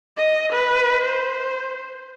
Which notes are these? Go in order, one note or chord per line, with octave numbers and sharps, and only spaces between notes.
D#5
B4
C5